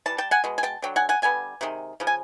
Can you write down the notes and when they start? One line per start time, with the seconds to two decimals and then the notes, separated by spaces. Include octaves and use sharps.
0.06 E3 G3 A5
0.18 G5 A5
0.31 F#5 G#5
0.44 B2 G#3
0.58 G#5
0.63 G5 A5
0.82 D3 F#3 G5
0.96 F#5 G#5
1.09 F#5 G#5
1.22 D3 G3 B3 G#5
1.61 C3 D#3 G#3
2.00 C#3 F3
2.07 G#5